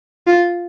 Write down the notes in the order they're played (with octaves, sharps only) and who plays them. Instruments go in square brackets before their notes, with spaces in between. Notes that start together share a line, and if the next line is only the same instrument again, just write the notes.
[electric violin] F4